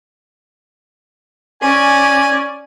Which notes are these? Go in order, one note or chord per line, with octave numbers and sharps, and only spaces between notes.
C#4 D5 G#5